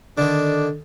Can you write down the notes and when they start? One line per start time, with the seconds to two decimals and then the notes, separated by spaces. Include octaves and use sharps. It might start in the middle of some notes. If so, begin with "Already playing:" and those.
0.18 D3 D#3 D4